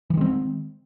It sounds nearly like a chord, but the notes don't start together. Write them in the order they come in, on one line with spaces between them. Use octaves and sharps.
E3 D#3 G#3 C4